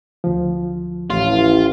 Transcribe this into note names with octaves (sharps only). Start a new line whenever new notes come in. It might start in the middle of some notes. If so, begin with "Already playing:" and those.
D2 F3
A1 F4